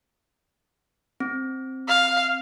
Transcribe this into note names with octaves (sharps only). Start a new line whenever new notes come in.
C4
F5